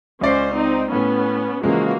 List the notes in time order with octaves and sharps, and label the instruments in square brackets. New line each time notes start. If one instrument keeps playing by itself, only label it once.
[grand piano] C#2 D5 C7 [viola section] C#4 C5
[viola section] C4 D#4
[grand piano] A2 [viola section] B3 C#4
[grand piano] C#3 F3 G#3 [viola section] E3 A#3 F#4